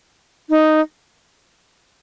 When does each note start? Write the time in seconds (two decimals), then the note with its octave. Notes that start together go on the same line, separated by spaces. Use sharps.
0.50 D#4